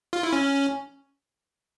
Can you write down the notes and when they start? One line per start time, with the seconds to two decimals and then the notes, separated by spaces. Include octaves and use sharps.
0.13 F4
0.23 E4
0.33 C#4